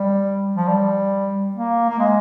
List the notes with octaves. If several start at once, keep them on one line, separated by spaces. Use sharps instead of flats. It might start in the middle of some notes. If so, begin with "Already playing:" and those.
Already playing: G3
F3
G3
A#3
A#3
G#3